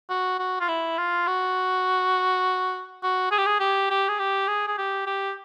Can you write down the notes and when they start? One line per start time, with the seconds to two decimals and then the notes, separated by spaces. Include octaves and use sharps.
0.10 F#4
0.39 F#4
0.60 F4
0.69 E4
0.98 F4
1.27 F#4
3.03 F#4
3.31 G#4
3.38 G4
3.46 G#4
3.60 G4
3.90 G4
4.08 G#4
4.19 G4
4.48 G#4
4.67 G#4
4.78 G4
5.06 G4